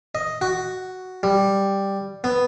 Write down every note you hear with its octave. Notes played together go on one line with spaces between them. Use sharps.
D#5
F#4
G3
B3